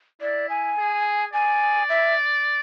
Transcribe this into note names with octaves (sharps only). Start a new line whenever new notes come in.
E4 D5
G#5
G#4
D5 G#5
E5